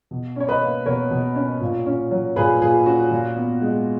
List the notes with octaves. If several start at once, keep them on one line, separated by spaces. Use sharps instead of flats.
B2
C#4 C#5
B4 D#5
A#3
B2 A#4 C#5
B2
C#4
A#2
C#4
F#3
A#2 G#4 B4
A#2 G#4
C#4 F#4
A#2
B3
G#3